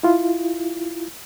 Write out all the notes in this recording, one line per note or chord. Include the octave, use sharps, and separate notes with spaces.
E4 F4